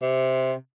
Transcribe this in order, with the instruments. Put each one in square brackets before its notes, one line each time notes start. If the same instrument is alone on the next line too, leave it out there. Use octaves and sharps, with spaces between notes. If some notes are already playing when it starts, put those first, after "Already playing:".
[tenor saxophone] C3